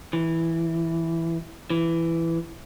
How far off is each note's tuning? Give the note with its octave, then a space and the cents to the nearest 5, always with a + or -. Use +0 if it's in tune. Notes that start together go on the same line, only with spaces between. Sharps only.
E3 +0
E3 +10